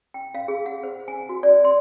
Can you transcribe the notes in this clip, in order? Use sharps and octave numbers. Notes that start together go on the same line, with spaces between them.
G5
F5
G#4
F#5
C5
G#5
F#4
D5
C6